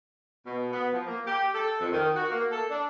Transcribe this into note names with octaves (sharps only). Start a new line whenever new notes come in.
B2
B3
F3
A#3
G4
A4
F2
D#3
F#4
A#3
A4
D4